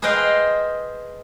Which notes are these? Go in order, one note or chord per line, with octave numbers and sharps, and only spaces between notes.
G#4 B4 C5 D#5 F5 G5